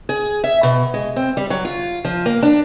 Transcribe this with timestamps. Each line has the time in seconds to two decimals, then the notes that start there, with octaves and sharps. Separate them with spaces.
0.09 G#4
0.44 E5
0.63 B2
0.94 G#3
1.16 C4
1.37 G3
1.50 F#3
1.65 F4
2.05 F3
2.26 A#3
2.43 D4